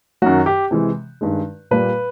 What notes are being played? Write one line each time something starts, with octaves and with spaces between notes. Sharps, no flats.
F#2 D#3 F#3 F#4
G4
C3 E3 G#3
G2 D#3 G#3
A#2 G3 B4